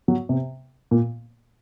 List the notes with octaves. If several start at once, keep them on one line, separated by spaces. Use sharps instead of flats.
F#3
C3
A#2